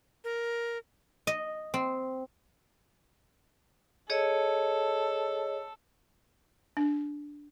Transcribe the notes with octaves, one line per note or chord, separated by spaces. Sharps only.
A#4
D#5
C4
G#4 A4 C#5 D#5
D4